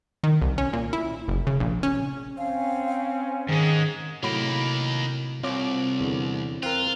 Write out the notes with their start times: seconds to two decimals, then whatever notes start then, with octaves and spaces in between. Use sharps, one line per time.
0.24 D#3
0.42 C2
0.58 C#4
0.73 A#2
0.93 E4
1.28 F#1
1.47 C#3
1.60 A#1
1.83 C#4
2.38 C4 C#4 F5
3.49 G#2 D#3 G#3 G#4
4.23 A2 C3 F#3 A#3 D#4 B5 D7
5.43 C2 C4 F4 C#5 D6
6.00 E2 D3
6.63 C4 F4 A#4 F#6